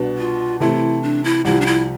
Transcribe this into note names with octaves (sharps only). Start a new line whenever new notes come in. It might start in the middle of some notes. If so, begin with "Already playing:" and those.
Already playing: C2 B2 B3 D4
F4
C3 E3 A3 C4 E4
D4
E4
C2 C3 F3 E4
D4
E4